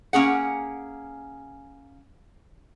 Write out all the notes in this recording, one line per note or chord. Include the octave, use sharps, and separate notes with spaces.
A#3 C#4 G#4 F#5